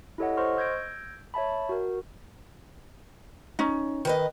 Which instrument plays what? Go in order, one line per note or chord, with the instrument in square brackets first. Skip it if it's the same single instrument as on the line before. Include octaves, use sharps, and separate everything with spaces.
[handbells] E4 G4 A4 C#5 D#5 F#5
C5 D#5 C6 C#6 F6
E6 G6 G#6 A#6 D7
C#5 E5 A5 B5
F#4 A#4
[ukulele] C#4 D#4
[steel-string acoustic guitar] D#3 B4 D#5